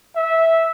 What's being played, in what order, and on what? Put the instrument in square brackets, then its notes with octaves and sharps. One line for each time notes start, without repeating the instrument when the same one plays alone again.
[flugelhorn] E5